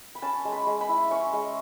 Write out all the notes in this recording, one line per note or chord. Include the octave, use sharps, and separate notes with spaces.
B5
C#4 A5
G#3
B5
G#3
B5
E4
C#4 C#6
G#3